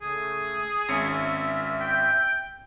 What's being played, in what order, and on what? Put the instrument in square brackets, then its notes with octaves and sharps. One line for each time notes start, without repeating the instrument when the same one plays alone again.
[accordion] C#3 A3 [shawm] G#4
[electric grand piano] G#1 C#4 C#7 [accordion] E5
[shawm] G5